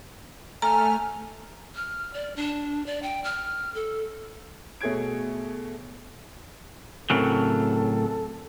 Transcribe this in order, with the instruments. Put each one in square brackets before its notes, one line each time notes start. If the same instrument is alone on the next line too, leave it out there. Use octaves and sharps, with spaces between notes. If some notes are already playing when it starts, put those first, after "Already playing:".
[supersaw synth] A3 F6 [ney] G#5 [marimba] A#5
[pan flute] F6
D5
D4
D5
G5
F6
A4
[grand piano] B2 A3 G#4 C#5 G#6 D7
[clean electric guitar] A2 C#3 F#3 [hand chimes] C4 A#4 [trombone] A4